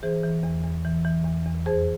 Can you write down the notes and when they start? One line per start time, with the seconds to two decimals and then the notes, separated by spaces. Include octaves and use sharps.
0.03 E3 G#4 C5
0.23 E3
0.43 E2
0.64 E2
0.85 E3
1.05 E3
1.25 E2
1.46 E2
1.66 F2 G#4 C5